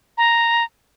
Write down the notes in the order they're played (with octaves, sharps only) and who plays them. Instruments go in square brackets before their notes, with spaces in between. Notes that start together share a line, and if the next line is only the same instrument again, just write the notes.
[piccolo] A#5